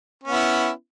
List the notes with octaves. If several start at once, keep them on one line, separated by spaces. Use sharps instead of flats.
B3 C#4 E4